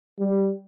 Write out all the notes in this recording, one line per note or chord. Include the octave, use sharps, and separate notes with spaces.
G3